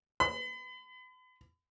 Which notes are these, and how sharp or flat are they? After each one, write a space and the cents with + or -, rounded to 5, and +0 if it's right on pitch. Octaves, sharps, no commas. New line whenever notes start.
B5 +40